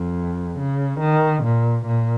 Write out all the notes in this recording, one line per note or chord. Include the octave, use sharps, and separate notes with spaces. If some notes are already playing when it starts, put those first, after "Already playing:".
Already playing: F2
C#3
D#3
A#2
A#2